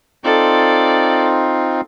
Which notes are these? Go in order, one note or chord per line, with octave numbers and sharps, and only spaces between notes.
C4 D#4 F4 A4 D5